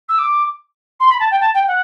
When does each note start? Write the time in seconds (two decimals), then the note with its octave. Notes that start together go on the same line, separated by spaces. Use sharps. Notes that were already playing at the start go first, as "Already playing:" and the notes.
0.08 E6
0.18 D6
1.00 C6
1.09 B5
1.19 A5
1.31 G5
1.40 A5
1.54 G5
1.67 F#5